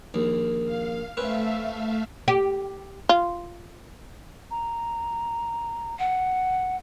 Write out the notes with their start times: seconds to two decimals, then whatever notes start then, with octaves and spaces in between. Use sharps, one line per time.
0.14 A#1 D#2
0.66 F5
1.17 A3 C4 C#4 B4 E5 F5
2.28 G4
3.09 F4
4.51 A#5
5.99 F#5